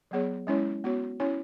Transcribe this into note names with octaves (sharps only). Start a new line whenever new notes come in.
F#3 B3 G#4 C#5
G#3 C#4 E4 C#5
B3 F#4 C#5
C#4 E4 C#5